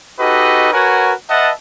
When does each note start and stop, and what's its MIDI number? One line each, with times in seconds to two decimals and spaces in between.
0.19 0.70 63
0.19 0.70 66
0.19 0.70 67
0.19 0.70 69
0.19 0.70 71
0.19 0.70 75
0.72 1.13 66
0.72 1.13 70
0.72 1.13 71
0.72 1.13 73
0.72 1.13 78
0.72 1.13 80
1.30 1.50 71
1.30 1.50 75
1.30 1.50 76
1.30 1.50 78
1.30 1.50 81